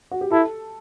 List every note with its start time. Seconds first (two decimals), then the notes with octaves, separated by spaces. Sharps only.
0.11 F#4
0.21 G4
0.31 E4 A4